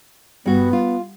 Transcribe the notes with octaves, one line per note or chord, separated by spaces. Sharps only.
G2 B3 F#4
F4